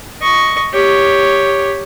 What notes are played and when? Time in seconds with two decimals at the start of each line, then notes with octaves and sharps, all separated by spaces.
0.22 D#5 C#6
0.74 G4 C#5